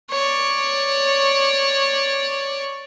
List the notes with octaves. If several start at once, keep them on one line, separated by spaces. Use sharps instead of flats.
C#5 D5